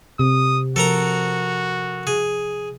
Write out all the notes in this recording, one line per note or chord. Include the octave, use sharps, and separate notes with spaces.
C3 D#6
F3 F#4 A4 A#4 A#5
G#4